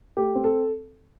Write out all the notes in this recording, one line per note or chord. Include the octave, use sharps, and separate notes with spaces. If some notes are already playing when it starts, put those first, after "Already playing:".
A3 G4
C4
A4